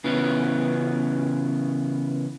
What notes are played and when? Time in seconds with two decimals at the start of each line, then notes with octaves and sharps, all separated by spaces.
0.04 C#3 E3 B3 C#4